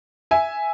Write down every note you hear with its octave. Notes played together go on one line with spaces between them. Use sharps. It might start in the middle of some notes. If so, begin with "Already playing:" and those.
E5 G#5